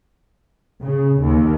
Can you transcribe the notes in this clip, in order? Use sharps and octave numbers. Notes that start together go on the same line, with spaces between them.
C#3
D#2